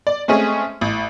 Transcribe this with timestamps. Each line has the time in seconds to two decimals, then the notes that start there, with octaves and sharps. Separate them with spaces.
0.07 D5
0.28 G#3 A3 C4 C#4 G#4
0.81 A1